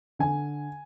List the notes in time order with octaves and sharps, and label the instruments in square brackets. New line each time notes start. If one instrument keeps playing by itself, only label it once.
[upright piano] D3 G#5